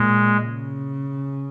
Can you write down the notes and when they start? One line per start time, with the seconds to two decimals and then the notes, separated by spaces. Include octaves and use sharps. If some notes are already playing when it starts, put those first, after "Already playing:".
Already playing: A#2 G#3
0.43 C#3